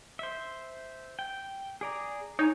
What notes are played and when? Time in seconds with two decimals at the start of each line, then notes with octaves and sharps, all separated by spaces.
0.19 C5 E5
1.19 G5
1.81 G#4 D5 A#5
2.39 D#4 C#5 G#5 A#5